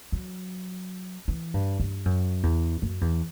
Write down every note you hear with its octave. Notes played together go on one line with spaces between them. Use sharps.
F#3
E3
G2
G2
F#2
E2
F#2
E2